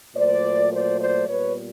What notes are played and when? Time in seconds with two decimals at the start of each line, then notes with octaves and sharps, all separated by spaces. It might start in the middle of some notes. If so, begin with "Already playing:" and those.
0.15 A#2 F#3 A3 C5 D5
0.72 C5 D5
0.99 C5 D5
1.28 A#2 G3 B3 B4 C#5